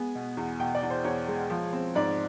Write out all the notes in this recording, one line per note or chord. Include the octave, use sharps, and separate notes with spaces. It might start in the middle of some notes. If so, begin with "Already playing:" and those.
Already playing: G#3 B3 G#5
B2
E2
B2 G5
D5
E2
C5
E2 C#5
G#3
F3
C4
G#2 D5